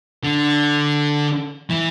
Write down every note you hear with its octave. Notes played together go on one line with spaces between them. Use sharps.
D3
E3